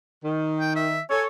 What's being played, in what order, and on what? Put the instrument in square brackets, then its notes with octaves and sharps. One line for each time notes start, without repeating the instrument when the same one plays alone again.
[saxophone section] D#3
[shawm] G5
E5
[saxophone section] A4 C#5 [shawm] G#5